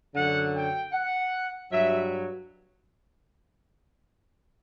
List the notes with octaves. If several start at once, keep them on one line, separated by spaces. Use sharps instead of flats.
F#2 D3 F#3 F#5
G5
F#5
G2 F#3 E5